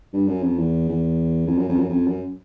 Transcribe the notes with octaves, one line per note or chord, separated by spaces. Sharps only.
G2
F#2
F2
E2
E2
F2
F#2
F2
F#2
F2
F#2